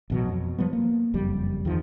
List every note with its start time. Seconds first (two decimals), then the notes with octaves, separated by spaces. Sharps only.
0.10 A1 B2 F#3
0.29 F2
0.58 F3 G3 B3
0.73 A#3
1.14 F#1 F2 G3
1.65 E2 D#3 F3